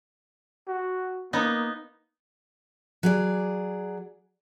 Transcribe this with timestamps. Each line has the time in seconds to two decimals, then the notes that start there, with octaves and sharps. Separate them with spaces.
0.68 F#4
1.33 A#3 B3 D#4
3.03 F#3 G#4 D5